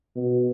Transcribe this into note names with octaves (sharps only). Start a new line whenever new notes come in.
B2